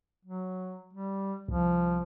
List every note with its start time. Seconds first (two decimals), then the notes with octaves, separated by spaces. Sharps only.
0.25 F#3
0.93 G3
1.48 C2 F3